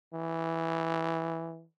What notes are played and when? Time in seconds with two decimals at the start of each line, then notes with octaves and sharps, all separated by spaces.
0.13 E3